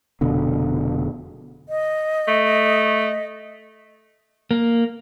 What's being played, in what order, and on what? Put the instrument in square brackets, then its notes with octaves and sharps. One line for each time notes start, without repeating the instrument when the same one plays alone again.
[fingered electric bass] F1 B2 D3
[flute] D#5
[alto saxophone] A3
[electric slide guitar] A#3